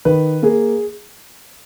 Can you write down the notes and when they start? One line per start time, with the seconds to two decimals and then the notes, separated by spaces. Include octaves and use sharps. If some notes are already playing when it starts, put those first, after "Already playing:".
0.05 D#3 B4
0.43 A#3 G#4